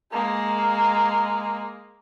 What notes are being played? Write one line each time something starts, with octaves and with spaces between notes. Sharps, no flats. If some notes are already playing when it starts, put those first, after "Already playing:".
G#3 A#3